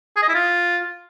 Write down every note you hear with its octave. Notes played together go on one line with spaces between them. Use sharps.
G#4
D#5
E4
F4